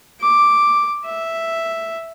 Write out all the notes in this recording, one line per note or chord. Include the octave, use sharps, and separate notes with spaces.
D6
E5